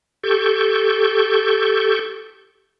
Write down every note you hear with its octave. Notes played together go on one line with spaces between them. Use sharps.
G4 A4 C#6 G6